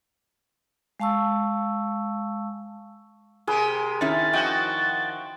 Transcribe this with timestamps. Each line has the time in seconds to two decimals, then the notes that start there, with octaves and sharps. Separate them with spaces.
1.00 G#3 F5 A5 C#6 E6
3.47 C3 G4 G#4 A#4 B4
4.01 D#3 C#4 E4 A6
4.33 F3 F#4 D#5 G5